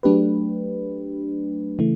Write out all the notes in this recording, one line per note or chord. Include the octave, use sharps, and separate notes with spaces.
F#3 A3 D4 G4 B4
C#3 E3 A3